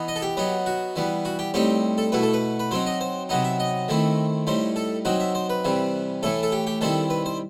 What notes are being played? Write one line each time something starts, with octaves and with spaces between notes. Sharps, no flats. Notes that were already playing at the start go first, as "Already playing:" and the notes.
Already playing: E3 B3 D#4
D#5
A4
G4
F#3 B3 D#4
F#4
E3 G3 B3
F#4
G4
A2 G3 C4 D#4 G4
A4
B2 A3 E4 B4
A4
B4
B4
F#3 C4 D#4 C5
D#5
C5
C3 F#3 B3 D#4 D#5
E5
D#5
D#3 A3 C4 E4
A2 G3 D#4 C5
A4
F#3 C4 D#4 F#4
E5
C5
B4
C3 E3 G3
A2 E3 A3 A4
A4
G4
G4
D#3 G3 C4 E4 A4
B4
C5